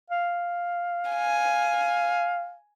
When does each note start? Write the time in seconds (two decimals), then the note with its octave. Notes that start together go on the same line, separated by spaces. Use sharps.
0.10 F5
1.11 G#5